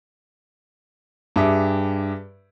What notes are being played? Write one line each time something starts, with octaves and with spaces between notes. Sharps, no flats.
G2 G4 G#4 E5 D6